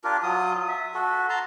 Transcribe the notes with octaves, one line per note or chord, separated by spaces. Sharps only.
D4 F4 G4 A#4
F#3 F4 D#6
E5
F#4 A4
A5 A#5 C6